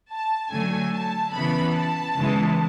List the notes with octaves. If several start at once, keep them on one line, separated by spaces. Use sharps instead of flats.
A5
D3 F#3 A3 G#5
A5
C#3 E3 B3 B5
A5
C#3 E3 G#3 B3